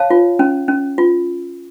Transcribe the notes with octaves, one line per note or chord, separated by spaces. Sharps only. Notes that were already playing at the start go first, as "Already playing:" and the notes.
Already playing: C#5 F5 A5
F4
C#4
C#4
F4